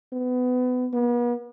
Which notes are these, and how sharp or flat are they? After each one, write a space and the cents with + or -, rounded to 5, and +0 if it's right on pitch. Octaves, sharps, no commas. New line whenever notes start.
B3 +25
B3 -40